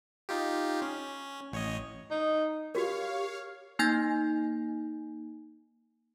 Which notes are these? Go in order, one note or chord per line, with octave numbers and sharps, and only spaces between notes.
D#4 F4 G4
C#4
A1 C#5 D#5
D#4
F#4 G4 A#4 C#5 F5
A#3 D#4 G#5 G6 A#6